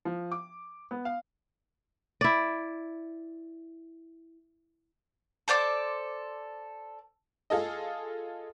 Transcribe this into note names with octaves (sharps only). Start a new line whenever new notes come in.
F3
D6
B3
F5
E4 D5
A4 C5 D5 D6
F4 G#4 A4 D#5